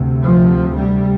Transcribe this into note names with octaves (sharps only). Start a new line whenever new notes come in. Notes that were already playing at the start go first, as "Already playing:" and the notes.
Already playing: D2 C3
F3
G3